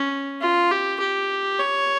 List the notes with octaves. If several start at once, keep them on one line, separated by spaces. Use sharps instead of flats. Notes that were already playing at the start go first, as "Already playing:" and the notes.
Already playing: C#4
F4
G4
G4
C#5